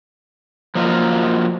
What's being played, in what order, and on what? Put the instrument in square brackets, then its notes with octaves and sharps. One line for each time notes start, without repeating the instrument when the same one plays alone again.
[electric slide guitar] F3 F#3 A#3 F4 D#5